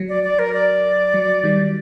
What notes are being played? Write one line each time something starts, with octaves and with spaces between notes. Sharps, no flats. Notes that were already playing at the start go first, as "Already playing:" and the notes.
Already playing: F#3
D5
D5
A#4
D5
F#3
D#3 G3